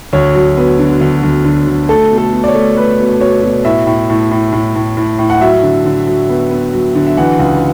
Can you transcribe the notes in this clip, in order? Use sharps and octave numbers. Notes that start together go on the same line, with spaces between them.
D2 C#5
F#3
B3
D3
D2
D2
D3
D3
A3 A4
B2
A4
B2
D5
C#5
A3
A3 B4
B2
B2 C#5
B2
A2 E5
A2
A2
A2
A2
A2
A2
A2
F#5
F#3 E5
D3
D3
F#3
B3
B3
F#3
D3
E5
E3 F#5
C#2